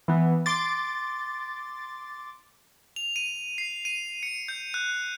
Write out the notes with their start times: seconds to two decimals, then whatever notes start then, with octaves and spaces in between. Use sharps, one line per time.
0.08 E3 B3
0.46 C6 D6 A6
2.96 F7
3.16 D#7
3.58 C7
3.85 D#7
4.23 C#7
4.48 G6
4.74 F#6